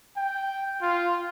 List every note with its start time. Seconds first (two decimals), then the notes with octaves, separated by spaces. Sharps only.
0.17 G5
0.81 F4